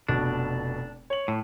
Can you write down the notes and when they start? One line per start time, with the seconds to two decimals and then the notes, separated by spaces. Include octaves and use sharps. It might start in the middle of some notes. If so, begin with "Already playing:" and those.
0.08 F1 B2 D4
1.10 C#5 F#7
1.28 A2